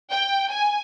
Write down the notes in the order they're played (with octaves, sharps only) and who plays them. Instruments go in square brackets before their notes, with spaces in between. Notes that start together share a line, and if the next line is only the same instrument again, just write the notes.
[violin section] G5
G#5